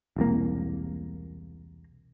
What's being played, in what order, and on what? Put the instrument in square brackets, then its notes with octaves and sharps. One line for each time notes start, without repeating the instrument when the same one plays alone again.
[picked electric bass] E1 C2 A#3